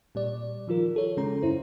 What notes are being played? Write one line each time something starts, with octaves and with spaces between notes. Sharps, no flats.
A#2 G3 D5
D#3 F3 F4 A#4
A4 C#5
C#3 G#3 C#4 A#5
F#2 E4 C5